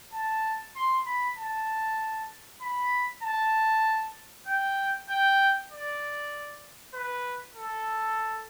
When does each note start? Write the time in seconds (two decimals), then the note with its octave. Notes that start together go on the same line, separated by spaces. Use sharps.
0.13 A5
0.75 C6
1.06 B5
1.38 A5
2.61 B5
3.23 A5
4.47 G5
5.09 G5
5.70 D5
6.94 B4
7.56 A4